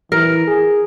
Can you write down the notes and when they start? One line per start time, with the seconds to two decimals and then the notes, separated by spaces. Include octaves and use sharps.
0.12 E3 A#4
0.47 G#4